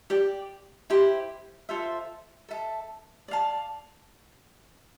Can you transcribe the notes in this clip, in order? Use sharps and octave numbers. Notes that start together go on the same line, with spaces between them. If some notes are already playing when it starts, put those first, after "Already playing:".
G4 D5 G5
E4 G4 C5
F4 A4 C5 E5
A4 E5 A5
D5 F5 A5